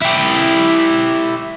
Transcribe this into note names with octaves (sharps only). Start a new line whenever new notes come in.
E4 G4